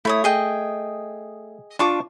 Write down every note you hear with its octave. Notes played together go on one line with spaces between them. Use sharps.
A3 E4 C#5 D#6
G#4 D#5 G5
D4 F4 A5 C#6 D6